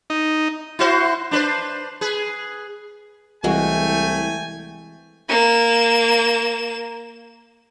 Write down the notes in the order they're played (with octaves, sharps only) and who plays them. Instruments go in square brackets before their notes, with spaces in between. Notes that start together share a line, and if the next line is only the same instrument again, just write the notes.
[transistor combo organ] D#4
[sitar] E4 F#4 C5
D4 B4 C5
G#4 B4
[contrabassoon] C2 [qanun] E3 G#3 F#4 [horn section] A3 G5 G#5
[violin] A#3 E7